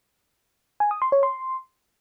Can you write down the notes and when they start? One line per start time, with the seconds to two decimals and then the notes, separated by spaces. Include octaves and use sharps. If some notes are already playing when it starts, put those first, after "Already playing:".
0.80 G#5
0.91 D#6
1.02 C6
1.12 C#5
1.23 C6